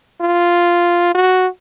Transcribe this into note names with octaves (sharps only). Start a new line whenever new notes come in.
F4
F#4